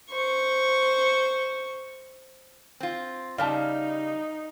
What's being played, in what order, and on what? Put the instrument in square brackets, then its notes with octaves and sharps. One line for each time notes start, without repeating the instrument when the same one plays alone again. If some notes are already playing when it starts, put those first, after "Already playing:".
[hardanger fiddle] C5 C#6
[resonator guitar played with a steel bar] C4 F4
[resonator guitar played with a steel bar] C#3 G3 [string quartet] D#4 [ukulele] D5 E5 A5 [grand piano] F5